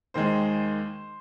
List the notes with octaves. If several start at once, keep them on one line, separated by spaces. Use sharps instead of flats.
D#2 D#3 G#3 C5